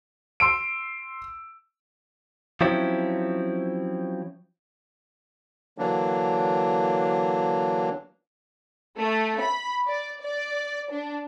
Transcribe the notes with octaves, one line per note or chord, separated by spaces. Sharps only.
C6 E6 D7
F3 F#3 C4 C#4 E4
D3 E3 F#3 A#3 D4
A3
B5
D5
D5
D4